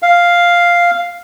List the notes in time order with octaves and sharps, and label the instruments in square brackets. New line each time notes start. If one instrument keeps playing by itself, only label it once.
[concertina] F5